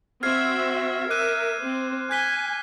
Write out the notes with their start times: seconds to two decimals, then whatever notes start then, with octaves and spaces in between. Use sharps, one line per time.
0.23 C4 F#4 E5 F6 G#6 C7
1.10 A#4 E5 D6 F#6 D#7
1.62 C4 C5
2.11 G#5 F#6 B6 G7